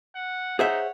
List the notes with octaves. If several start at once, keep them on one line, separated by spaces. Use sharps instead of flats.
F#5
D#4 G#4 C5 C#5 E5 F#5